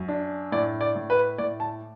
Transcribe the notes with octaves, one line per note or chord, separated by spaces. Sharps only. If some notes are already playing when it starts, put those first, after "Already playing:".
Already playing: F#2
D4
A2 D5
D5
A2
B4
A2 D5
A5